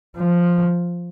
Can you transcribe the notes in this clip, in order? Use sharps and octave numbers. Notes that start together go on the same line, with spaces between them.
F3